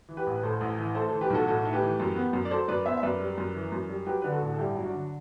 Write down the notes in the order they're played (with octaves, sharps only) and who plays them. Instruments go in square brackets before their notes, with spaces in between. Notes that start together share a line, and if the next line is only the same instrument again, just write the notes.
[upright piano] E3
G4 B4
A1
B4
A2 A4 C5
A1
E3
A3 A4 C5
E3 A4 C5
G4 B4
B1 F#4 A4
A2 F#4 A4
A3
G4 B4
E3
F#2
B3
F#2
D5
F#3 A4 C5
F#2 B4 D5
B3 C5 E5
E5
F#2 B4 D5
G3
F#2
E3
F#2
G3
F#3 G4 B4
D3 B4
F#4 A4
A1
A4
G2 E4 G4
F#3 E4
D4 F#4
D3